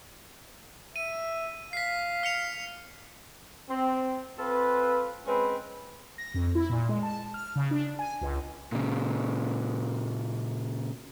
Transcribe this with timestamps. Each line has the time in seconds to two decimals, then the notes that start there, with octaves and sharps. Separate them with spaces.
0.96 E5 D#7
1.73 F5 B6 C7
2.23 F6 C#7 F7
3.69 C4
4.38 C4 F4 A4 B4
5.26 G#3 C4 C#4 B4
6.18 A#6
6.34 F2
6.55 E4
6.70 A#2
6.89 G#3
7.03 A5
7.34 F6
7.56 C#3
7.71 D4
7.99 G#5
8.21 C#2
8.72 A#2 C#3